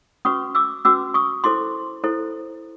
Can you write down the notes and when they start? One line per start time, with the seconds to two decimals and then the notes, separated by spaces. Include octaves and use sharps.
0.25 C#4 F#4 B4 C#6 D#6
0.55 D6 E6
0.85 C#4 F#4 B4 D6 E6
1.14 C#6 D#6
1.44 E4 A4 C5 C6 D6
2.04 E4 A4 C5